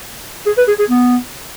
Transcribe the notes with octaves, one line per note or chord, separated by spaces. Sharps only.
G#4
B4
G#4
G#4
B3